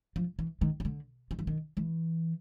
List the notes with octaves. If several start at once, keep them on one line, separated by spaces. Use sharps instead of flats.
F3
E3
D#3
C#3
D3
D#3
E3
D#3
E3